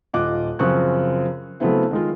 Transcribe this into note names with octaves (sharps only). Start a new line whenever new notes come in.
D#1 F4 D#5 D6 F#6
F#2 C#3 F3 C4 C#6 F#6
C#3 F#3 A3 B3 C4 E4
D#3 G#3 F4